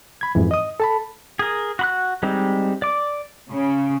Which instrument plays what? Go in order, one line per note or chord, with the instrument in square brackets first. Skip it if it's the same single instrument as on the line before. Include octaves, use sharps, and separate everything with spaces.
[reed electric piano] B5 G#6
F2 G#2 E3
D#5 D#6
A4 A5 B5
[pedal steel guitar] G#4 A#4
F#4 B5 F#6
G3 G#3 C4 D#4
D5 D6
[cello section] C#3